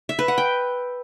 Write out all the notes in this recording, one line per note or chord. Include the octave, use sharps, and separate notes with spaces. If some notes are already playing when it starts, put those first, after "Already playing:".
E5
B4
F#5
G5